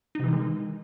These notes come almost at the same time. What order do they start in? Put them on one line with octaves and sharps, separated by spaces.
D#4 C3 E3 D#3 G#3